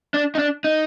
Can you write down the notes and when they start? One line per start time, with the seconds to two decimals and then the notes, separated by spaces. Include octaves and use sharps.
0.14 D4
0.35 D#4
0.39 D4
0.64 D#4